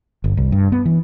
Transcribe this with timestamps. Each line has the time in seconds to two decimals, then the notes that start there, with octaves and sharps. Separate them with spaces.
0.24 G1
0.37 C2
0.52 G2
0.72 B3
0.85 E3